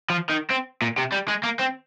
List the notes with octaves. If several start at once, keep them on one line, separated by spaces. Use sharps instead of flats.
F3
D#3
C4
A#2
C3
G3
G#3
A#3
C4